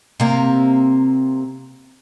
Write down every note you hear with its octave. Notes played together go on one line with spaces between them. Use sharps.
C3 A#3